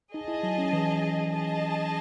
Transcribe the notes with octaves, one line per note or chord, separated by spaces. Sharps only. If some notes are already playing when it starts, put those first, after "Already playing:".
D#4 G#4 D#5 A5
E4
F#3
C#4
E3
G#4 D#5 A5